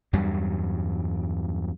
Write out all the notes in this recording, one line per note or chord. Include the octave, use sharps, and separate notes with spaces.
E2 G2 F#3 G3